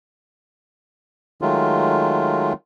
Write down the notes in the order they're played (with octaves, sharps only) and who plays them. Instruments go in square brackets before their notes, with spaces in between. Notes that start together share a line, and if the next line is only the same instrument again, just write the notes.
[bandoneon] D#3 F#3 G#3 A3 F4